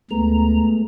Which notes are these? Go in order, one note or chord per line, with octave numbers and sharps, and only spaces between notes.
D2 G#3 A3 B3 A#5